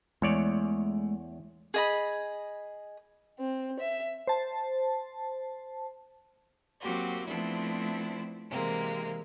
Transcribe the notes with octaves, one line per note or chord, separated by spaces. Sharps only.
E2 G#3 A3 C#5 D5
G#4 D#5 B5
C4
E5
C5 A5
F#3 A#3 C4 F#4 G4
F3 A3 B3 C4 D4 E4
C3 E3 G#3 A#3 C4